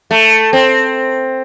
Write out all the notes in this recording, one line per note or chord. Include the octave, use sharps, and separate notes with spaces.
A3
C4